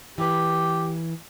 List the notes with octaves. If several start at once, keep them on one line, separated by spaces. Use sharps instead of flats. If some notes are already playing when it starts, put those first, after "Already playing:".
E3 G4 B4